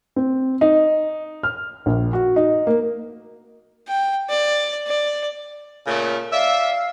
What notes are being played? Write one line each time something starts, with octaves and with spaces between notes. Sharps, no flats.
C4
D#4
F6
A#1
F#4
D#4
A#3
G5
D5
D5
A#2 C#3 A3
D5 E5 F5